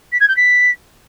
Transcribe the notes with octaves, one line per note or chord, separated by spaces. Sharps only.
B6
G#6
G6
B6